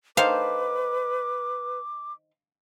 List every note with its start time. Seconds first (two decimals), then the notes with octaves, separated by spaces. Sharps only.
0.17 D#3 A4 B4 C5 F5 D6